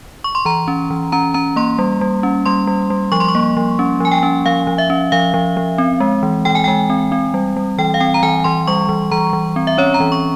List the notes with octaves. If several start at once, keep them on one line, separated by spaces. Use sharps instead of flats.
C#6
C6
E3 A#5
C#4
E3
C#4 A#5
C#4 A#5
A#3 C6
G3
G3
C#4
G3 C6
G3
G3
F3 C#6
C6
C#6
A#3
F3
C#4
F3 G#5
G5
C#4
F3 F5
F3
E5
C#4
F3 F5
F3
F3
C4
G#3
E3
E3 G5
G#5
G#3 G5
C4
C4
G3
G3
E3 G5
F5
C4 G5
A#5
E3 G#5
E3 C6
G3 C#6
E3
E3 A#5
E3
C4
E5
C#4 C#5
A#5
E3
C#6